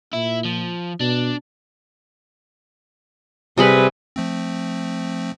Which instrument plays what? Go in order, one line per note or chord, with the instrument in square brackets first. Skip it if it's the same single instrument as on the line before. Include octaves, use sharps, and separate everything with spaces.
[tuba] A#2 [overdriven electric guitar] E4
[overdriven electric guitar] F3
[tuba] B2 [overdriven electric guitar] D4
[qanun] C3 G#4 B5 [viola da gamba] G3 B4
[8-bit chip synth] F3 A3 C4